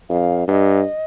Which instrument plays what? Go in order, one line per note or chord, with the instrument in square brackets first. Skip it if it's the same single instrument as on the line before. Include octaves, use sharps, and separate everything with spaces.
[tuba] F2 [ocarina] F5
[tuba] G2 [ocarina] F5
[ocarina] D#5